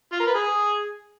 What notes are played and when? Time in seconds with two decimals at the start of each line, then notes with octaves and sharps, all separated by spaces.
0.12 F4
0.20 A#4
0.27 B4
0.34 G#4